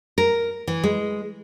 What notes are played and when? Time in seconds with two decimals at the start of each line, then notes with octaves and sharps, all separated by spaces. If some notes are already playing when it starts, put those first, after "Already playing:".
0.18 A#4
0.67 E3
0.83 G#3